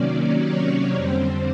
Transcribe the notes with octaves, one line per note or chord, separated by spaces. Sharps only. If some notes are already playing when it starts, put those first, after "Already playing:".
Already playing: C3 D#3 F#3 A#3 C#4 D5
C#5
F2 D3 G3 C4 C5